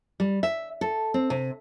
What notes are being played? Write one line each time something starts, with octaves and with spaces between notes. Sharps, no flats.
G3
E5
A4
C4
C3